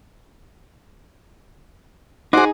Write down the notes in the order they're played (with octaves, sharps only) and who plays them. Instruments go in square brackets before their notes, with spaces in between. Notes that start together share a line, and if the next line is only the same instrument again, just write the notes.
[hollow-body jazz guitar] D#4 G#4 [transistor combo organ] F#4 C5 D6